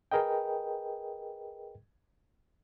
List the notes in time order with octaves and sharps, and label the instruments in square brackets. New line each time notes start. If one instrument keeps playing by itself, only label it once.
[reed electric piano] G#4 A#4 B4 D#5 G5